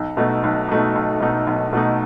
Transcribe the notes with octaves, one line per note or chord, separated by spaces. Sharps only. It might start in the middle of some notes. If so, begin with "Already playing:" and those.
Already playing: B1
B2 A3 D#4
B1
B2 A3 D#4
B1
B2 A3 D#4
B1
B2 A3 D#4